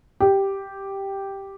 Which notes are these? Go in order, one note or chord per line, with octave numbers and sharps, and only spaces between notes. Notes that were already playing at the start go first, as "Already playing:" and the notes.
G4